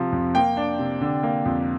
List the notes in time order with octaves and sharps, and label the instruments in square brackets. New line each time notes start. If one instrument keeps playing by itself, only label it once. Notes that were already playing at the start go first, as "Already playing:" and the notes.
Already playing: [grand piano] C3 F3
F2
A#3 G5
D4
C3
D3
A#3
F2